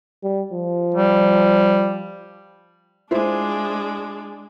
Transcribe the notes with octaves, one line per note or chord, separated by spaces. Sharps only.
G3
F3
G3
G#3 D4 E4 F4 C5